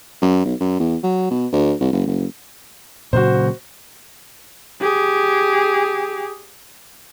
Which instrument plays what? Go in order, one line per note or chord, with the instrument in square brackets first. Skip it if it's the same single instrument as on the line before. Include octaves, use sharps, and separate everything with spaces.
[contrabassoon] F#2
B1
F#2
E2
F#3
B2
D2
C2
F#1
F#1
[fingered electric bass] A#2 C#3 F#3 [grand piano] F#4 C5
[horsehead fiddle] G4 G#4